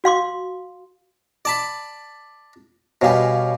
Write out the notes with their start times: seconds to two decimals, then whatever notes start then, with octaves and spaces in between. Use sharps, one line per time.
0.04 F#4 F5 C6 D6
1.45 D5 A5 B5
3.02 B2 G3 C#5 F5 G#5